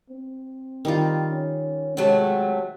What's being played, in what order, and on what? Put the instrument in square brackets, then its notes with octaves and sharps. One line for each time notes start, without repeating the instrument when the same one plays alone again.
[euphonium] C4
[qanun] D#3 G3 F4
[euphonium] C#4
[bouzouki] C3 F#3 A3 [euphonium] G#3